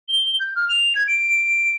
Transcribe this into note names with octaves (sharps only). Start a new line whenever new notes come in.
G7
G6
F6
F7
G#6
D7